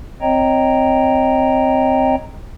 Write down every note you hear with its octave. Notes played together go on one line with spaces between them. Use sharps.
C4 C#5 D#5 G5 A#5